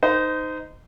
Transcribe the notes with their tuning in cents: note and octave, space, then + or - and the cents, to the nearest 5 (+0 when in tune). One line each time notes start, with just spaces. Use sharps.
D#4 +0 C5 -30